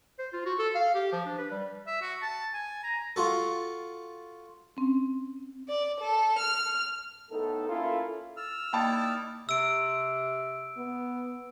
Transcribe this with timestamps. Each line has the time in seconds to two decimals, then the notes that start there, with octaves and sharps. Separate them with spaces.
0.19 C5
0.33 F4
0.46 F#4
0.59 A4
0.75 F5
0.95 G4
1.12 F3
1.26 D4
1.38 B4
1.51 G3
1.87 E5
2.01 F#4
2.22 A5
2.53 G#5
2.83 A#5
3.16 F4 F#4 A4
4.77 C4 C#4
5.69 D5
6.00 A4
6.38 F6
7.31 A2 B3 D#4 A4
7.69 A#3 C#4 E4 F4 A4
8.37 E6 F6 A6
8.73 A#3 D#4 E4 D5 G5 A5
9.49 C3 E6 D7
10.78 B3